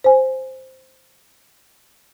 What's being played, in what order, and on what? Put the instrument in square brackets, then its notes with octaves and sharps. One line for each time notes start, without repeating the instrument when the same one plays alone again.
[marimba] C5 G#5